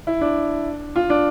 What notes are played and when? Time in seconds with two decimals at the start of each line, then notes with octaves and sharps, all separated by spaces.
0.07 E4
0.21 D4
0.96 F4
1.10 D4